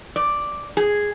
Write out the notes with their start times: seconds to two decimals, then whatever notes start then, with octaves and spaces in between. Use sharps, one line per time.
0.16 D5
0.77 G#4